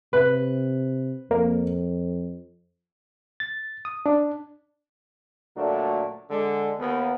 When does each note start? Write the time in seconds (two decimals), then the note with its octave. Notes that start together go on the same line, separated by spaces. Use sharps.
0.13 C3 B4
1.31 F2 A#3
3.40 A6
3.85 D#6
4.06 D4
5.56 D2 A#2 F#3 A3 D4
6.30 D3 G#3
6.79 D#2 B3